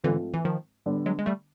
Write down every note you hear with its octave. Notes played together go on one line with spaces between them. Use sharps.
G#2 D3 E3 F3 A3 C4 F4
E3
D#3 F3
D3 G3 B3 D4
F#3 G#3
G#3
G3 A3